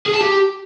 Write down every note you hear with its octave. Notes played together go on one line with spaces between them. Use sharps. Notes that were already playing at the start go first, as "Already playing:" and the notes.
G#4
A5
G4